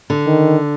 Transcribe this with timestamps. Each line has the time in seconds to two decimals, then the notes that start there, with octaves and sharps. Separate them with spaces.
0.10 D3
0.27 D#3